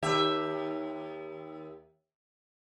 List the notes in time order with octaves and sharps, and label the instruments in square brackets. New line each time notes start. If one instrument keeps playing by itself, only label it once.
[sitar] D#2 G4 E5